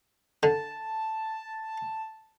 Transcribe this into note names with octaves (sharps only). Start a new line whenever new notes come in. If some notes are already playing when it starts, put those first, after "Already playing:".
D3 A5